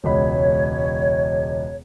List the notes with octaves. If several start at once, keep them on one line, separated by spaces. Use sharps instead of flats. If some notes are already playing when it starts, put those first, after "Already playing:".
E1 C#2 C#5 B5